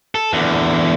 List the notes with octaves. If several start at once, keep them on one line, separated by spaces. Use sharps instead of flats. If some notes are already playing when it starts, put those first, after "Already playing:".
A4
E2 D3